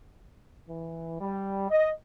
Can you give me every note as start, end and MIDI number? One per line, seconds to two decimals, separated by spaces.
0.68 1.18 52
1.20 1.67 55
1.70 1.90 75